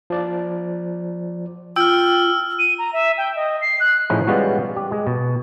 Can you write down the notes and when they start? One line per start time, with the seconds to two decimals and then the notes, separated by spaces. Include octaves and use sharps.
0.10 F3 D5
1.76 F4 G5 E6 F6
2.59 D#7
2.79 A#5
2.93 E5
3.18 G5
3.36 D#5
3.61 C7
3.80 F#6
4.10 A2 F3 C#4 D#4 E4 G#4
4.27 G3 G#3 B3 C#4 F4 F#4
4.76 G4
4.92 G#3
5.07 B2